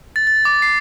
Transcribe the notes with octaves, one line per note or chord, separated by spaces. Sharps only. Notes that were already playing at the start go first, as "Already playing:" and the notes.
A6
A6
D6
C7